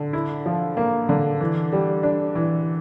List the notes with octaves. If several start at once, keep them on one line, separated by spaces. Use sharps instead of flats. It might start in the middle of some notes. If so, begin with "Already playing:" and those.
Already playing: D3
E4
F3
A#3
D3
E3
G3
D4
E3